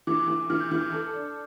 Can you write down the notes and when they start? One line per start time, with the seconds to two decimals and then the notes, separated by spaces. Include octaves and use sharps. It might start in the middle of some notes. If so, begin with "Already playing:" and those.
0.07 E3 D6
0.28 E3
0.50 E3 F6
0.60 G6
0.71 E3 F6
0.92 A4
1.14 D4